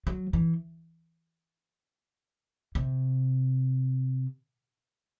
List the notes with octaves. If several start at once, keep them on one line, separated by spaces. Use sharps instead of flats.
F#3
E3
C3